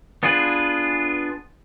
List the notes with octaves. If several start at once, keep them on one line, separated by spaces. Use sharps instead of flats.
B3 D4 F4 G#4 B4